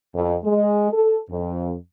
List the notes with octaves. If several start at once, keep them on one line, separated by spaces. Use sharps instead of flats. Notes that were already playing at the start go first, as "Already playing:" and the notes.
F2
G#3
A4
F2